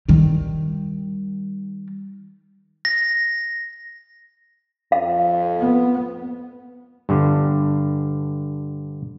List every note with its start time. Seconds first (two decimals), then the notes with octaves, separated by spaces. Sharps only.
0.09 D#3 G3
2.85 A#6
4.92 F2 F5
5.60 B3
7.09 G2 D3